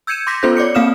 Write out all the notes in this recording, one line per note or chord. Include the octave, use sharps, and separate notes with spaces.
E6 G6 G#6 C#7 D#7 E7
C6 D6 G6 A#6 B6
B3 C#4 F4 A4 C5 G6
C#5 D5 D6 C#7
A#3 C4 F5 D#6 F6 E7